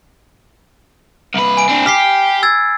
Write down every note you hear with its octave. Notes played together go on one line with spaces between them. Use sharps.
C2 B4
G#5 B5 D7
C4 D4
G4 F6 B6 C7
E6 G#6 A6